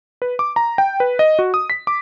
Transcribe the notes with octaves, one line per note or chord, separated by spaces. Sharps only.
B4
D6
A#5
G5
B4
D#5
F#4
D#6
B6
D6